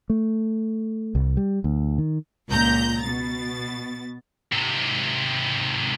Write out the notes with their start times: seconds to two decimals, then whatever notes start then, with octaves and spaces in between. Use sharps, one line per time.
0.10 A3
1.15 C2
1.37 G3
1.64 D2
1.98 D#3
2.48 C#2 A#2 A#5 G6
3.01 B2 A6
4.52 G#2 C3